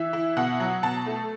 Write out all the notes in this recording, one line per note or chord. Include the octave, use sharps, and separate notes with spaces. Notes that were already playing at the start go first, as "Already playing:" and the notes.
Already playing: E3 E5
E4
B2 F#5
F#3
B2 A5
A3